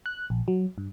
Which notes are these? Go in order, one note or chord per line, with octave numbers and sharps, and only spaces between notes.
F#6
A#1
F#3
G2